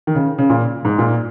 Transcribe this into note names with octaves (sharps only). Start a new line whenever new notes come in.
D#3
C#3
C#3
A#2
G#2
A#2